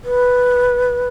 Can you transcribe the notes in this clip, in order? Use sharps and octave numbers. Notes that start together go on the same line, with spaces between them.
B4